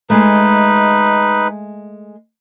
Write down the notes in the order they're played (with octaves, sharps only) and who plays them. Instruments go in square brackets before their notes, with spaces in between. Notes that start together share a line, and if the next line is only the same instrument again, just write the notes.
[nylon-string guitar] G#3 A3 [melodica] D#4 B4